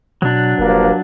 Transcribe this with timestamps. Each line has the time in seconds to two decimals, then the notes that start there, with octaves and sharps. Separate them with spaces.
0.22 B2 F#3 D4
0.59 E1 G2 F3 A#3